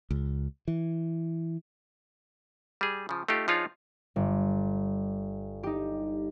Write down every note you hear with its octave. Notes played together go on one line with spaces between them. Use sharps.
C#2
E3
G3 G#4
C#3 F3
A3 D#4 F4 G4
F3 D4 D#4 F4 G#4 C#5
G1
D#4 G4